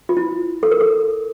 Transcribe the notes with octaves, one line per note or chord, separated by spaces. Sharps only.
F4
E4
A4
A#4
A4